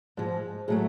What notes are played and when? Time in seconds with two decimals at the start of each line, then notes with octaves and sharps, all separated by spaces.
0.17 G#2 F3 G#3
0.68 A2 F#3 A3 G#4